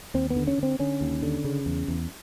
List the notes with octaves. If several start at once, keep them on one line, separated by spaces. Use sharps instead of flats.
D#2 C4
B3
D3
C#4
D3 C4
D3 C#4
D#2
D3
C#3
E2
E2